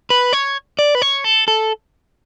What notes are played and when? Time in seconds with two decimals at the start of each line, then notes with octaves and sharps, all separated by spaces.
0.10 B4
0.33 C#5
0.79 D5
0.95 B4
1.02 C#5
1.24 A4
1.48 A4